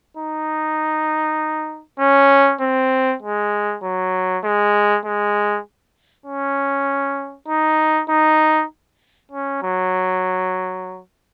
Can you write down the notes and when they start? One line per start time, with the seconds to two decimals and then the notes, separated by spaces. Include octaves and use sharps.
0.17 D#4
1.99 C#4
2.60 C4
3.22 G#3
3.83 F#3
4.44 G#3
5.05 G#3
6.26 C#4
7.48 D#4
8.09 D#4
9.32 C#4
9.62 F#3